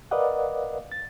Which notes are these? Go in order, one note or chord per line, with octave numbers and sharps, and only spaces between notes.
A#4 B4 D5 D#5 F5 F#5
A6